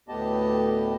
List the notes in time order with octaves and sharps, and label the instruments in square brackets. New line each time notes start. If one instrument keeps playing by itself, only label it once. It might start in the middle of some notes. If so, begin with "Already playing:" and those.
[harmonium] D2 A2 B3 G4 D#5 A5